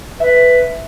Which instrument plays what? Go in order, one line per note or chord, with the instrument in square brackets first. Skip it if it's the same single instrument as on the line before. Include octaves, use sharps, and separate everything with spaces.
[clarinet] B4 [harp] E5